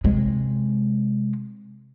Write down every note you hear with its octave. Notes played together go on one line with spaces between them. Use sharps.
C3 G#3